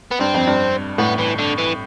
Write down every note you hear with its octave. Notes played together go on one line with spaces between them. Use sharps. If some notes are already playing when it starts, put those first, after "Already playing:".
B3
G2 C4
F2
G2
A2 B3
E3
D3
E3